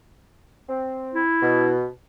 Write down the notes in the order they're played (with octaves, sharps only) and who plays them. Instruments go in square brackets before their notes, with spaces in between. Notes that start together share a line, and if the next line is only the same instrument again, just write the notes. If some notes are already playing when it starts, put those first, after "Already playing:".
[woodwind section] C4
[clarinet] E4
[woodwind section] B2